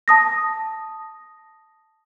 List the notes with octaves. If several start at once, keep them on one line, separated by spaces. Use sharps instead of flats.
A5 D#6 A#6